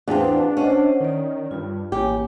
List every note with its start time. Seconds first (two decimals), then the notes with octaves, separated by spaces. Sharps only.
0.08 E2 C4 D4 F#4 B4 F5
0.57 C#4 C5 D#5 F#5
1.00 D#3 D#4 D5
1.51 G2 F4
1.92 A1 A#3 G4 C#5 G#5